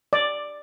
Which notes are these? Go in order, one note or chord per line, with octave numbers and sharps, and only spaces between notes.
D5